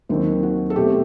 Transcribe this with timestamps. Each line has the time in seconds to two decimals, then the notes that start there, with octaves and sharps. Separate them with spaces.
0.09 D#2 D#3 F#3 C4
0.43 F#4
0.70 A4
0.76 B2 A3 C4 G4